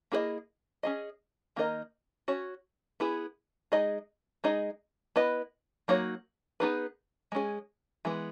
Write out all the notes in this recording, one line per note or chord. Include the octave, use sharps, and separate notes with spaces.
A#3 E4 G#4 B4 D#5
C#4 G#4 D#5
D#3 A#3 D#4 A#4 D#5
C#4 F#4 C#5
B3 E4 G#4
G#3 D#4 G#4 D#5
G#3 D#4 G#4 D#5
B3 E4 B4 D#5
F#3 A#3 D#4 F#4 C#5
B3 D#4 G#4 B4
G#3 C#4 G#4
E3 G#3 B3